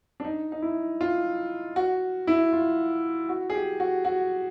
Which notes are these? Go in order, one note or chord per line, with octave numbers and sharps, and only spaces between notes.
D4
D#4
D#4
E4
F4
F#4
E4
F4
F#4
G#4
G4
F#4
F#4